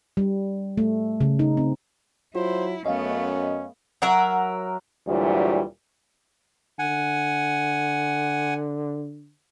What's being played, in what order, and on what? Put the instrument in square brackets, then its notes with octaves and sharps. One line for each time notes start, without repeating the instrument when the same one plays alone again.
[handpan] G3
A3
C#3
D#4
C4
[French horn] F#3 [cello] E4 [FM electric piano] F4 [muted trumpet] C5
[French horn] F#2 [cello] A3 B3 [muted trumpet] C#4 [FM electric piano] D#5 F5
[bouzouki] F#3 A#4 E5 F#5
[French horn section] D2 A#2 E3 F#3 G3
[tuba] D3 [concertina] F#5 G#5